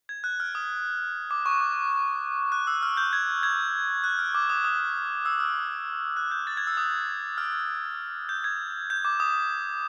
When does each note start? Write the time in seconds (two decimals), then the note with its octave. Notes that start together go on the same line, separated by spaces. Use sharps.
0.09 G#6
0.24 F#6
0.40 F6
0.55 D#6
1.31 D6
1.46 C#6
1.61 D6
2.52 F#6
2.67 E6
2.83 F6
2.97 G6
3.13 G#6
3.43 G#6
4.04 F#6
4.19 F6
4.35 D6
4.50 D#6
4.65 D#6
5.25 E6
5.40 F6
6.16 F#6
6.31 G6
6.47 A6
6.57 G#6
6.67 E6
6.77 D#6
7.38 F6
8.29 G6
8.44 G#6
8.90 G6
9.05 D6
9.20 D#6